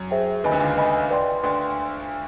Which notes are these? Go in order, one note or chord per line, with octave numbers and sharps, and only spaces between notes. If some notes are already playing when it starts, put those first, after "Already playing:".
Already playing: F#2 F#3
G#4 C5 E5 G5
D#2 D#3 B4 D#5 G#5 B5
D2 D3
C#2 C#3
B4 D#5 G#5 B5
B4 D5 G5 C6
D2 D3 B4 D5 G5 C6